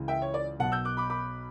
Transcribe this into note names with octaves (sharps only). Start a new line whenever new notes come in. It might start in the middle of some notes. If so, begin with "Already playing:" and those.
Already playing: C#2 C#3 E3
E5 G5
C#5
D5
B1 B2 F#5 A5
E6 G6
D6 F#6
B5 D6
B5 D6